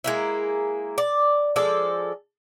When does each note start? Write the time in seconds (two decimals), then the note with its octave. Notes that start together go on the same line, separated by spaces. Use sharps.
0.04 G#3 A#3 E4
0.98 D5
1.56 F3 G#3 A4 D5